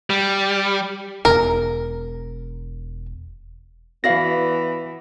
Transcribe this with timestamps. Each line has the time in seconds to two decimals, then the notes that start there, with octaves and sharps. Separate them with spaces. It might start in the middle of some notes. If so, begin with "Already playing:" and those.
0.10 G3
1.25 E1 A#4
4.04 E3 B3 F#4 D5 F5 A#6